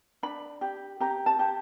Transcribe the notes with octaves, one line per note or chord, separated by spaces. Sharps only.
D4 B5
G4
G4 A#5
A5
G4